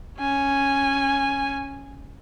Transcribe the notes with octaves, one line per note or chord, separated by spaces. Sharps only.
C#4 G#5